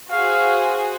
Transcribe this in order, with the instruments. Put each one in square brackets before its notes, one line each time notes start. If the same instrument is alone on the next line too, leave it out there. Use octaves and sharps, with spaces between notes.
[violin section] F#4 G#4 C5 [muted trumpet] F5